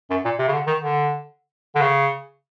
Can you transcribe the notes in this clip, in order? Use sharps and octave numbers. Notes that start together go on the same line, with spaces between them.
F#2
A#2
C3
C#3
D3
D#3
D3
D3
C#3